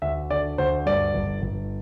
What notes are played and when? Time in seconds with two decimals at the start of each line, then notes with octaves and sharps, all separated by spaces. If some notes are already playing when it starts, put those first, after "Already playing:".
0.02 D2 E5
0.30 D3 D5
0.58 D2 C5
0.86 G2 D5
1.14 G1
1.42 G1